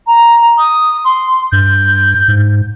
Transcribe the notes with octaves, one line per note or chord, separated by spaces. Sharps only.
A#5
D#6
C6
G2 G6
G#2